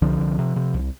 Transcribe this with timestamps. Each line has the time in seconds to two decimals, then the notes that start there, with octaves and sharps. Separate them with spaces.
0.02 C2 D3 F3
0.20 C2
0.39 C3
0.56 C3
0.74 C2